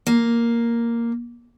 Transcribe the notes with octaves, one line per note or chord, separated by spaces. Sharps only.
A#3